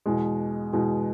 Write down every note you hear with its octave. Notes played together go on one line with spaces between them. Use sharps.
E2 B2 G#3
E2 B2 G#3